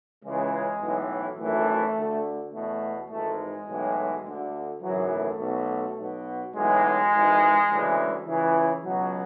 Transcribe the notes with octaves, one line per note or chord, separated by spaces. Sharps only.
C#2 C#3 E3 G#3
B1 A2 E3
G#1 F#2 E3 A3
D2 D3
E2 B2 A3
G#1 G#2 E3 A3
G#3
B1 A2 E3
D2 D3
G#1 F#2 C#3 E3 F#3
A3
B1 B2
B1 B2
B1 A2 E3 G#3
G#1 G#2 E3
D2 C#3 E3
C#2 C#3 E3
C#2 B2 F#3